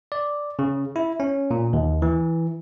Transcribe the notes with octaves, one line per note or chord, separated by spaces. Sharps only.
D5
C#3
E4
C#4
A#2
D#2
E3